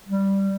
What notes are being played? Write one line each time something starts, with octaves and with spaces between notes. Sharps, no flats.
G3